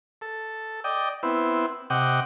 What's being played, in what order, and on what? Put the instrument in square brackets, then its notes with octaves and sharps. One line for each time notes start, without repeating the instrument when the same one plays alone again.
[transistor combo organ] A4
D5 D#5 G5
B3 C4 E4
C3 D#5 F#5 G5 D6